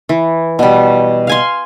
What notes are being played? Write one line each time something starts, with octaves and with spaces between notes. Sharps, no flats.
E3
B2 G3
F5 G#5 C6